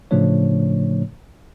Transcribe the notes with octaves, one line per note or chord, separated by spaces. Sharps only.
A2 C#3 F3 A3 D4 C#5